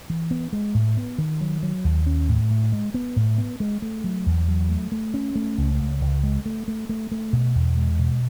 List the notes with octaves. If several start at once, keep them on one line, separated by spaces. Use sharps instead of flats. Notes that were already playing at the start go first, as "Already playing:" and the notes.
E3
B3
G#3
A2
B3
D#3
F#3
F#3
D#2
C#4
A2
A2
G#3
B3
A2
B3
G#3
A3
F#3
E2
F#3
A3
A3
C#4
A3
C#2
C#2
C#2
G#3
A3
A3
A3
A3
B2
E2
G#3
B2